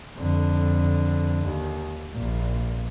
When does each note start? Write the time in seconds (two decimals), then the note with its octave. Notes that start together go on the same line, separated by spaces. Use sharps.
0.15 F2 D3
1.44 D#2
2.14 A#1 A#2